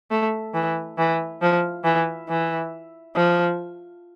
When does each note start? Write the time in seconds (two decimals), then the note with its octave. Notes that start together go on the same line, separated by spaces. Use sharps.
0.11 A3
0.54 E3
0.98 E3
1.42 F3
1.84 E3
2.29 E3
3.16 F3